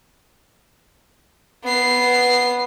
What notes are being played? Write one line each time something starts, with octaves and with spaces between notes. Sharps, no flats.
B3 C7